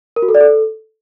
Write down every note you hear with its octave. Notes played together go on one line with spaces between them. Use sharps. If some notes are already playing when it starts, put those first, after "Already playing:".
A#4
F#4
A4
D5
A4